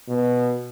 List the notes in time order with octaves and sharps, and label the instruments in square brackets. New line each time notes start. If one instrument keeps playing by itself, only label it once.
[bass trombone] B2